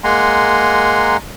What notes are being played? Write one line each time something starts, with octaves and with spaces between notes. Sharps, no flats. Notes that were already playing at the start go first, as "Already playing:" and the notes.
G#3 A#3 F#5 G#5 A#5 C6